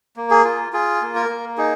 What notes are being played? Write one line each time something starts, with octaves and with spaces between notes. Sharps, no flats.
A#3
G#4
F4
F4 G#4
A#3
A#4
A#3
D#4 G#4